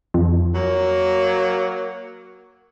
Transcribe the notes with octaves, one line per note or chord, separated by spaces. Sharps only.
F2
F#3 A#3